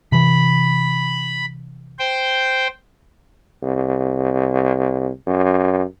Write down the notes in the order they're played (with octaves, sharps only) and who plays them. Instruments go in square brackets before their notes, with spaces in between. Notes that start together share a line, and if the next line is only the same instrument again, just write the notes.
[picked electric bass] C3 E3 [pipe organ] B5
[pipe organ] C5 G5
[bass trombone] C2
F#2